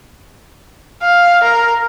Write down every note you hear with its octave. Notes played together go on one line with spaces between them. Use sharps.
F5
A#4